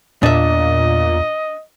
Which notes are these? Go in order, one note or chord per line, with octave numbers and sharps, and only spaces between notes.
E2 A#2 D4 D#5 E5